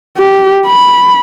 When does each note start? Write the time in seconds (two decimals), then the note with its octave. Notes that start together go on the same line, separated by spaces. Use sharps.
0.17 G4
0.66 B5